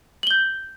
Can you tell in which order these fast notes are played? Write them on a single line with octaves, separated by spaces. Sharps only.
F#7 G7 G6